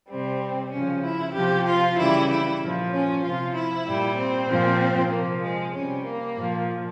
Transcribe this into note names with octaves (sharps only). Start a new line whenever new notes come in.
C3 G3 C4
C#3 F3 C#4
E4
C3 F3 G4
F4
C#3 E3 G3 E4
E4
A#2 F3
C#4
C3 F3 F4
E4
A#2 G3
C4
A#2 F3
C3 F3 A#3
G#3
C3 G3 C#4
A#3
A#2 F3